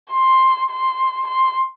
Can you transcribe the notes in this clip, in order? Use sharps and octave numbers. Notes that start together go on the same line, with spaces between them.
C6
C6
C6